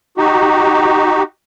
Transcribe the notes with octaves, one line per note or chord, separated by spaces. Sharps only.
D#4 F#4 G4